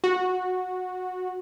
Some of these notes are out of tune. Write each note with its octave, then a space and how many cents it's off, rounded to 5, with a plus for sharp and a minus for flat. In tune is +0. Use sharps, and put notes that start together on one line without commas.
F#4 -10